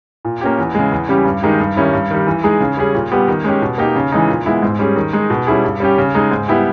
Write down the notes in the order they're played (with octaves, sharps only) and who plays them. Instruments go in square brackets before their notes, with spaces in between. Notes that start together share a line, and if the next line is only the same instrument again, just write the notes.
[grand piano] A#2
A#3 C#4 G4
E2
C#3 G#3
E2
C#3 G3 C#4 G4
G2
D#3 G#3 D#4 G4
G2
D#3 G3 C#4 E4
G2
D#3 G3
E3
G#3 D#4 G#4
C#3
G3 C#4 G#4
A#2
G3 B3 G4
D#3
G#3 C#4 G4
B2
A#3 D#4 G4
C#3
E3 G#3 D#4
A#2
G#3 B3 E4
G#2
G3 C#4 G#4
D#3
G#3 D#4 G#4
B2
G3 C#4 E4 G#4
G2
G3 C#4 G4
C#3
G#3 D#4 G#4
G#2
G3 B3 E4 G4